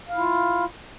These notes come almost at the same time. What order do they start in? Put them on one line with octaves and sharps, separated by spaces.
F5 E4 F4